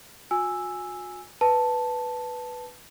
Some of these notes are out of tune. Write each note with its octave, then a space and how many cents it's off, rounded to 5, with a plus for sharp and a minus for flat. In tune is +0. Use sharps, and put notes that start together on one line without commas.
F#4 -45 G#5 +0 E6 +0
B4 +0 A5 +0